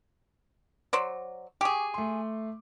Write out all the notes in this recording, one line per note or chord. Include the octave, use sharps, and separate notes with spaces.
F#3 C5 D5
G4 G#4 G#5 C#6 D6
A3 C6